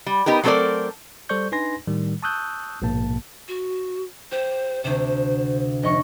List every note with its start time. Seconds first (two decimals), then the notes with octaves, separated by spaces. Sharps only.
0.06 G3
0.26 B3 D#4 G4 A#4
0.44 F#3 A3 C4 A4 A#4 D5
1.29 G3 A4 C5 D5 C#6 G6
1.52 D4 D#4 B4 G#5 C6 A#6
1.87 A2 D#3 G3
2.23 A5 C#6 D#6 E6 F#6 G6
2.82 A#1 G#2 B2 A#3 A5
3.48 F#4
4.32 G4 C5
4.84 D2 C3 C5
5.83 F1 D#5 C#6